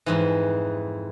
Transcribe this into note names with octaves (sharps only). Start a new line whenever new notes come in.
F2 G#2 E3